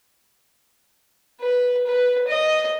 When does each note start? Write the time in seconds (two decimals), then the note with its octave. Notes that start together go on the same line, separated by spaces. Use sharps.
1.41 B4
1.87 B4
2.28 D#5